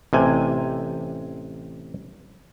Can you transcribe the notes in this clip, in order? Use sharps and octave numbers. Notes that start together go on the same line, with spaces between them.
A1 C3 G#5